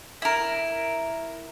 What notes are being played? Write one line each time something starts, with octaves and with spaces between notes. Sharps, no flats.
E4 A#4